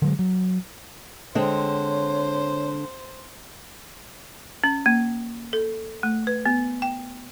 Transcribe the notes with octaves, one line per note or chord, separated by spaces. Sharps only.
D3 F#3 G#3
F#3
D3 G#3 C4 C5 C#5
C#4
A#3
A4
A3
B4
B3
G5